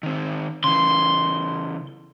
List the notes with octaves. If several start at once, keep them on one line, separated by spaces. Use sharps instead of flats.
D#3 C4
C#3 E3 C6